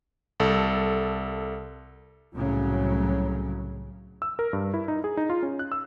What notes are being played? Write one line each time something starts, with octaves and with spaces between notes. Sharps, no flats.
C2 A4
C2 A2 C#3 F#3
E6
A#4
G2
E4
D#4
G#4
D#4
F4
C#4
F#6
E6